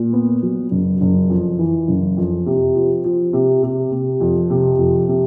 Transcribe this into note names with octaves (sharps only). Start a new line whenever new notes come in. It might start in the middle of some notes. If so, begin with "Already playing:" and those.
Already playing: A#2
B3
F#3
F#1
F#1
F2
E3
F#1
F2
C3
F3
F3
C3
C3
C3
F2
C3
F2
C3